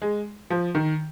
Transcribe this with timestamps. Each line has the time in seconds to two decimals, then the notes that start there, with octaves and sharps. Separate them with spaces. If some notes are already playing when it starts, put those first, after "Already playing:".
0.02 G#3
0.50 F3
0.75 D#3